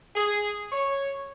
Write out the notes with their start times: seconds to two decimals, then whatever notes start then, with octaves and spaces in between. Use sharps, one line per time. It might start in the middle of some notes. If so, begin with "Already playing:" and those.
0.16 G#4
0.72 C#5